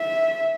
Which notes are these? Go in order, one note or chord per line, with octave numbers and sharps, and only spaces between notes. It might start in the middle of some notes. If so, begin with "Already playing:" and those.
Already playing: E5